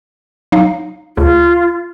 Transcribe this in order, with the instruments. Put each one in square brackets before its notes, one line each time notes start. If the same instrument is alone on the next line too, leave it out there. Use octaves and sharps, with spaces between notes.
[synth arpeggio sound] F#3 D#4 F5
[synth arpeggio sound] D2 C#3 [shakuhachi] F4